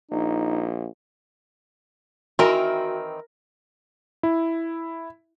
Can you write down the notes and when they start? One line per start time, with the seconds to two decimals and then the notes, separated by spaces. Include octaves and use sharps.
0.11 A#1 D#4
2.39 D#3 E3 C4 F#4 A#4 E5
4.23 E4